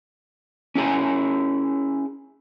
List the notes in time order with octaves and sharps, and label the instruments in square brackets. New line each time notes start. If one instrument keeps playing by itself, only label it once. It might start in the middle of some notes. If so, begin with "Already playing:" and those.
[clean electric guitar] C#4 E4 G#4 G#5